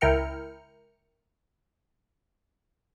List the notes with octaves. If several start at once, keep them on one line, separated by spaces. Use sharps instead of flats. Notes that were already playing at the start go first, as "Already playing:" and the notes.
C#2 E4 A#4 G5 F6 C#7